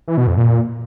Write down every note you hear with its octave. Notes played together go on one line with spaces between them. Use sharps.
E3
B2
F2
A#2